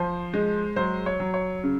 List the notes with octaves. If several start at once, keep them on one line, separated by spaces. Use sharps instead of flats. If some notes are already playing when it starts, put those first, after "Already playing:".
Already playing: F3 C5
G#3
F#3 C5
C#5
F#3
C#5
C#3